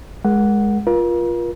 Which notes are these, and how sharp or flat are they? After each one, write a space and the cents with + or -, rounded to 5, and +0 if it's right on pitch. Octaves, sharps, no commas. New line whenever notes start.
G#3 +0 A#4 +30 F#5 +0
F4 +0 A#4 +40